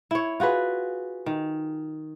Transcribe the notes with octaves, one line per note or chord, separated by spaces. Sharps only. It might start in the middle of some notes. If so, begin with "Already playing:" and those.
E4 C#5
F4 F#4 G#4 B4
D#3